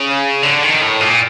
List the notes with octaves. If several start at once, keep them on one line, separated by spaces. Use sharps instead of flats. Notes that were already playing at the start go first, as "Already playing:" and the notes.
Already playing: C#3
D3
D#3
A2
A#2